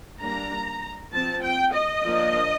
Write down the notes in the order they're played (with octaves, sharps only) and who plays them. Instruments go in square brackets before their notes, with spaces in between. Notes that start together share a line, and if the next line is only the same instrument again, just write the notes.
[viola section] G3 A#3 D4 A#5
F3 C4 A5
G5
D#5
F3 A#3 D4